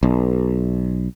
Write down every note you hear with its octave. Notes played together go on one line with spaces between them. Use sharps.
B1